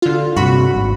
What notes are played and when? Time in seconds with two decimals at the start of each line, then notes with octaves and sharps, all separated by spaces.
0.02 D3 F4
0.36 G2 C3 F#4 B5
0.75 G#1